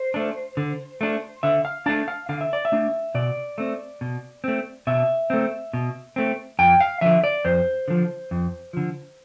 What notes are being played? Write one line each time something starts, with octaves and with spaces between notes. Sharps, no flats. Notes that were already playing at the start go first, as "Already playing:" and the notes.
Already playing: C5
A3 D4
D3
A3 D4
D3 E5
F5
A3 D4 A5
F5
D3 F5
E5
D5
E5
A3 D4
B2 D5
A3 C4
B2
A3 C4
B2 E5
A3 C4
B2
A3 C4
F2 G5
F5
D3 F3 E5
D5
F2 C5
D3 F3
F2
D3 F3